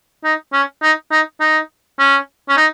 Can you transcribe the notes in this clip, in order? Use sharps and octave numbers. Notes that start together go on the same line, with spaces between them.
D#4
C#4
D#4
D#4
D#4
C#4
C#4
D#4